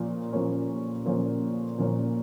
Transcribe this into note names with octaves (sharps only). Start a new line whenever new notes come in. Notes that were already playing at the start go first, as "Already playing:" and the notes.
Already playing: A#2 F3 A#3 C#4
A#2 F3 A#3 C#4
A#2 F3 A#3 C#4
A#2 F3 A#3 C#4